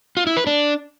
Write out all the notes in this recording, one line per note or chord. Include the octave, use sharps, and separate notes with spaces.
F4
E4
B4
D4